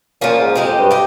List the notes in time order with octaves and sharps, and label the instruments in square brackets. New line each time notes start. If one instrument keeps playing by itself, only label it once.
[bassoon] A#2 [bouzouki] F3 A#3 C#4
[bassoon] G#2
[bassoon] F2 [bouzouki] G#3 C4 D#4 G4
[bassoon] F2
G2
[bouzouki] D#4 G4